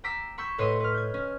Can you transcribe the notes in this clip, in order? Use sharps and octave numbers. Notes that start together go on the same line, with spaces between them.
G5 A#5 D6 E6 B6 C7
B5 C#6 E6 G6 G#6
A2 B4 C#5 D#5 C6 D#6
B4 F6
G6 G#6
C#4